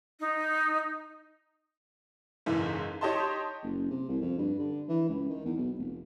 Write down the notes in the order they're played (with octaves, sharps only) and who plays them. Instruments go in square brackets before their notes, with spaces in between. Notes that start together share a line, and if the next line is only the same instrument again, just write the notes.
[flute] D#4
[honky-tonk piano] F#1 B1 G#2 E3
D#4 G4 C#5 D#5 A5 C6
[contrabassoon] F#1
C3
C2
F2
G2
D3
E3
C#2
D#3
E2
B1
F1